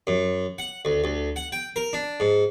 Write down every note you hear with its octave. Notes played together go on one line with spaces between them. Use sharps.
F#2
F#5
D2
D2
F#5
G5
A#4
D4
G#2